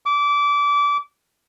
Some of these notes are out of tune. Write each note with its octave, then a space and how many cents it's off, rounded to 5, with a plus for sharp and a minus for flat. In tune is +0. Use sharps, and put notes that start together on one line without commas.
D6 -25